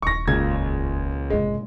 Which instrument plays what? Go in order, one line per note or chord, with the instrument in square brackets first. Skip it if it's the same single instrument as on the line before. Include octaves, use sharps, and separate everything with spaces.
[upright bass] D#1 D#2 [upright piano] C#6 A#6
[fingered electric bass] C#2 [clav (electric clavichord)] A#2 C#3 [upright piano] G#6
[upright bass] F1 G#2 [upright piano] G#3